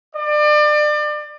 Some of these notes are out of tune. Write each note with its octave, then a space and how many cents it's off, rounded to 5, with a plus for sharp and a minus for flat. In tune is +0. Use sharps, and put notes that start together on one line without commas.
D5 +30